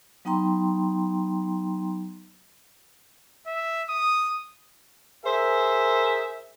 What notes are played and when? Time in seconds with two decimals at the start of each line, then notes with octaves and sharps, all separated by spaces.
0.25 F#3 B3 D#4 G5 A#5 C6
3.47 E5
3.89 D#6
5.24 G#4 A#4 C5 E5